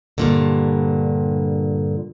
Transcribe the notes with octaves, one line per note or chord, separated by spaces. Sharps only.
G2 A#2 D3